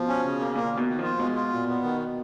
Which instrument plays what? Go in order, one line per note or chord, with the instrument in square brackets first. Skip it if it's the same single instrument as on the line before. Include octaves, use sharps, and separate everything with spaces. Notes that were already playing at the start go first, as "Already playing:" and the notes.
Already playing: [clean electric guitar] B2 [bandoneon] F3
[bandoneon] C#4
C#3
A#3
[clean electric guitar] A#2 [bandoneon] A#3
[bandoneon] D#3
[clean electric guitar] B2
[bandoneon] D#3
[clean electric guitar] F3
[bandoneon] F4
[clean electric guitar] B2 [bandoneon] G#3
[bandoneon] F4
A#2
B3
D#3